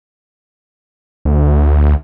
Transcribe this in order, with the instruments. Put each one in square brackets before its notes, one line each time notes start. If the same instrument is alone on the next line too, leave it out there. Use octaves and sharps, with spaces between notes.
[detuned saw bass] D2